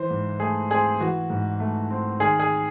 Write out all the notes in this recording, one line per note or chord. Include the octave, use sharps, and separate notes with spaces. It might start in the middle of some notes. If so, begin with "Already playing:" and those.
Already playing: E3 C5
G#2
A3 G#4
C4 G#4
E3 F#4
G#2
A3
C4
D#3 G#4
G#4